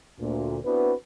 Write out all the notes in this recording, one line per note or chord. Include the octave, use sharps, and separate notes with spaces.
D2 A#2
B3 C4 D4 E4 F#4 B4